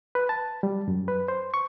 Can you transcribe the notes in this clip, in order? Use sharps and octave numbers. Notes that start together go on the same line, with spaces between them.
B4
A5
G3
F#2
B4
C5
C#6